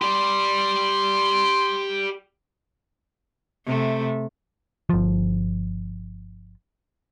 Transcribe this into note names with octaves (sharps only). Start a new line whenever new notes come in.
G4 D5 C6
C3 A3
G1 F3